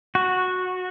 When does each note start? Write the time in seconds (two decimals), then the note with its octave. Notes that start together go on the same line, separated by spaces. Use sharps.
0.15 F#4